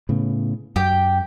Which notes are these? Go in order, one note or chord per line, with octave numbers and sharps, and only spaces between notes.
A2 C#3 B3
F#2 G4 G5